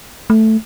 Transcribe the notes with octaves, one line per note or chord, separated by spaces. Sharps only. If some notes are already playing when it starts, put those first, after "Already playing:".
A3